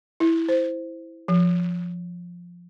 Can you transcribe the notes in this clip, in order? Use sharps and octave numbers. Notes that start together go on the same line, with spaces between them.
E4
C5
F3